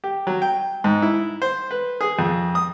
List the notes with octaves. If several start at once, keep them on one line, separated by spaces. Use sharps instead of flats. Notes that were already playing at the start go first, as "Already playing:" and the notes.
G4
F#3
G5
G#2
E4
C5
B4
G#4
F2
D#6